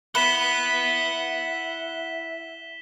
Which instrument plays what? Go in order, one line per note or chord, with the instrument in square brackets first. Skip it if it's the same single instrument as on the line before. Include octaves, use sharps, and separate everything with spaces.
[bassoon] E4 [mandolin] B4 [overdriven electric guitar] F#5 B5 [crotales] B6 E7 G7